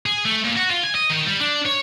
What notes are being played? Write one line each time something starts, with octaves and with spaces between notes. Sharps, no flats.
G#4
A3
A#2
F#4
F4
G#5
D#5
D#3
G3
D4
C#5